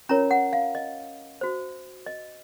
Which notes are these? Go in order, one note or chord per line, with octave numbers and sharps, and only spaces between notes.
C#4 F4 A#4 C#5 A#5
F#5
F5
D#5
F#4 C5
D#5